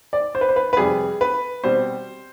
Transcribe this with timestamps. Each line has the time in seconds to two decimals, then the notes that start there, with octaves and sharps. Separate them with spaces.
0.13 D5
0.35 C5
0.41 B4
0.49 C5
0.56 B4
0.73 B4
0.77 F2 C3 G3 G#4
1.21 B4
1.64 B2 G3 C4 C5